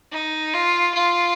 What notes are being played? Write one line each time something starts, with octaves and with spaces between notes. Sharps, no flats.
D#4
F4
F4